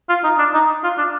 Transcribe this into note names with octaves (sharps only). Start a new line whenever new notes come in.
F4
D#4
D4
D#4
F4
D4